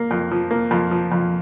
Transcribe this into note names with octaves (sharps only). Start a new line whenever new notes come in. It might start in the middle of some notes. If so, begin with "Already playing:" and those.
Already playing: A#3
F2
F3
A#3
F2
F3
F2